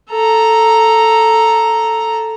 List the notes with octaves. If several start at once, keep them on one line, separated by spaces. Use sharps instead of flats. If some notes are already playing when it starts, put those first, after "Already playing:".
A4 A#5